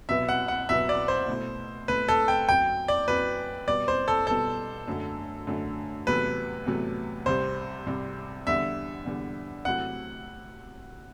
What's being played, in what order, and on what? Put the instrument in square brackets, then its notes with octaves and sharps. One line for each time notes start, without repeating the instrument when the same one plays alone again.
[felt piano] C2 B2 F#3 B3 [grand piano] E5
[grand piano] F#5
F#5
[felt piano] C2 B2 F#3 B3 [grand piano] E5
[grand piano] D5
C5
[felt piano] B2 A3 E4
[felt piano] B2 A3 E4 [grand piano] B4
[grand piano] A4
G5
[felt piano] F#2 F#3 C4 [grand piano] G5
[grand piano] D5
[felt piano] F#2 F#3 C4 [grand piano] B4
[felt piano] B2 G3 B3 [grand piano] D5
[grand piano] C5
A4
[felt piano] B2 G3 B3 [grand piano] A4
[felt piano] F#2 D3 A3
F#2 D3 A3
[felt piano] E2 C3 F#3 A3 [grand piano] B4
[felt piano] E2 C3 F#3 A3
[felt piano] C2 C3 G3 [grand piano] C5
[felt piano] C2 C3 G3
[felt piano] E2 D3 G3 [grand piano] E5
[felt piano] E2 D3 G3
[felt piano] C3 F#3 A3 C4 E4 [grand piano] F#5